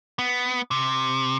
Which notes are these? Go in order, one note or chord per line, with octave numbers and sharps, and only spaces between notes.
B3
C3